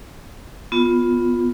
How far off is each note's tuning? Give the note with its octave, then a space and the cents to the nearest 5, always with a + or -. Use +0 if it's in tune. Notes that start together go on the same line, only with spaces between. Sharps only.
B3 +0 F4 +10